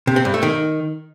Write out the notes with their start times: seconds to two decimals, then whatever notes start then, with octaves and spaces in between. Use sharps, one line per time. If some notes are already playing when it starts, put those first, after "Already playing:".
0.07 C3
0.16 C4
0.25 G2
0.34 A3
0.43 D#3